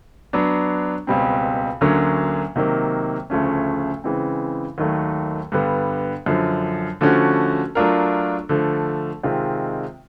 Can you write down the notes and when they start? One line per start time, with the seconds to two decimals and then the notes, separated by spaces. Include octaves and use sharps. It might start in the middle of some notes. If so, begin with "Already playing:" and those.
0.33 F#3 B3 D4
1.07 C#2 B2 G3 C4
1.81 D2 D3 F#3 A#3 C#4
2.56 C3 D#3 F#3 A#3
3.30 D2 C#3 F3 A3 C#4
4.04 C#3 E3 G#3 C4
4.78 D#2 D#3 F#3 A3
5.52 G2 D3 G3 B3
6.26 F#2 D3 F3
7.01 D3 F3 A3 C#4 F#4
7.75 F#3 A3 D4 F4 A#4
8.49 D3 F3 A3
9.23 C3 D#3 G#3 C4 F4